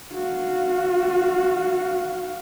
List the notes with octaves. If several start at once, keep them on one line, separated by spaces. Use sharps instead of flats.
F#4 F5